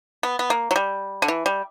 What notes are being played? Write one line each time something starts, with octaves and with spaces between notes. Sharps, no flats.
B3
B3
A#3
F#3
G3
D3
E3
G3